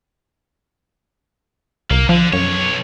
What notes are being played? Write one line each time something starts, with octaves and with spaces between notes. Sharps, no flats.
C2 A#3
D3 F3
B1 F#2 C#5